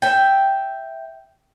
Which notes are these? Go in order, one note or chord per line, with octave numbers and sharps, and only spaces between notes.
E5 G5